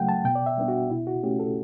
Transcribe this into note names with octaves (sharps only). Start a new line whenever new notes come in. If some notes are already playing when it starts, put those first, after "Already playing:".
Already playing: C#3 F#3 A3 F#5 G5
A5
B2 G5
D5
E5
G3 B3 D4
F#4
B2 E4
F#4
A3 C#4 G4
A4